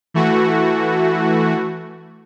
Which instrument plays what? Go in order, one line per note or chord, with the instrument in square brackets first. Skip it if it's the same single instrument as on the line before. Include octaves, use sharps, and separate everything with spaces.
[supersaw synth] E3 A3 F#4